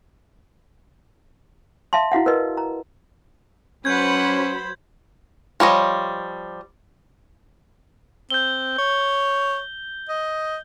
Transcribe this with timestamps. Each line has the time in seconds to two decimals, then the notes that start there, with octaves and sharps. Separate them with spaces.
1.93 E5 F5 A5 C6
2.12 E4 F#4 F5 F#5
2.26 A#4 B4 D#5
2.57 A#5
3.85 F#3 C#4 B4 C5 F#5 B5 G6 G#6
5.60 F3 G3 C#5 D#5
8.30 C4 G6 G7
8.78 C#5
10.09 D#5